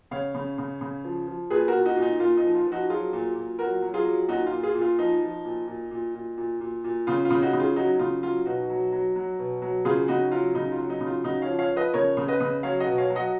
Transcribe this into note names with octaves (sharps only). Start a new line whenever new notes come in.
C#3 C#5 F5
C#3
C#3
C#3
F3
F3
A#2 G#4 B4
F#4 A#4
A#2
D#4 F#4
A#2
D#4
A#2 F4
D#4
F3
F4
F3
D#4 F#4
F#3 F4 G#4
A#2
A#2
F#3 F#4 A#4
F#3
F4 G#4
F#3
A#2 D#4 F#4
F4
A#2
F4 G#4
A#2
F4
F3 D#4
F3
A#2
A#2
A#2
A#2
A#2
A#2
A#2
C#3 F4
F4
C#3
D#4 F#4
C#3
F4 G#4
F#3 D#4 F#4
C#3 F4
F#3 F4
B2 D#4 F#4
F#3
F#3
F#3
B2
F#3
C#3 F4 G#4
C#3 D#4 F#4
F#3 F4
C#3 D#4
F4
F#3
D#4
C#3
F4
C#3 D#4 F#4
C#5 F5
F3
C#5 F5
F3
B4 D#5
C#3 A#4 C#5
C#3
B4 D#5
C#3
F#3 C#5 F5
D#5 F#5
B2
C#5 F5
F#3
D#5 F#5